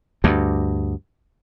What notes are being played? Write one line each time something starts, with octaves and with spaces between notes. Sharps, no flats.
D2 G2